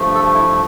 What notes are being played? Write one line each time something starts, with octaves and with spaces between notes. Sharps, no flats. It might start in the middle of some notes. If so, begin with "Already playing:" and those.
Already playing: G2 F3 A3
A4
E4